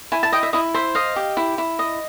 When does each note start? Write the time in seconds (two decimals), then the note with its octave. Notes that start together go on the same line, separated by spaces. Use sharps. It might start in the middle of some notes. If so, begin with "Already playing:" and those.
0.12 E4 G#5
0.23 A5
0.32 D#5 G5
0.43 E5
0.53 E4 D#5
0.74 C5 E5
0.95 D#5 F5
1.16 G4
1.37 E4
1.58 E4
1.79 D#5